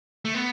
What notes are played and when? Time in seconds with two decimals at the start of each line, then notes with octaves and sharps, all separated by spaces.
0.25 A3
0.35 B3